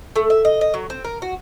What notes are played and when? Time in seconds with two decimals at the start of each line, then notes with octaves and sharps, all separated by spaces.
0.16 A3
0.30 E5
0.45 D#5
0.61 D#5
0.74 F#3
0.90 C4
1.05 A#4
1.22 F#4